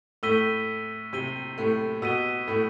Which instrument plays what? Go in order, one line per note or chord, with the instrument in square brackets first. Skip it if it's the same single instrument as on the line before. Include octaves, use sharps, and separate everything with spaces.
[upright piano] A2 A3 [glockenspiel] E6 B6 D#7 G7
[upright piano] C3 C4 [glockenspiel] E6 B6 D#7 G7
[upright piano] A2 A3
[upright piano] B2 B3 [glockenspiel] E6 B6 D#7 G7
[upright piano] A2 A3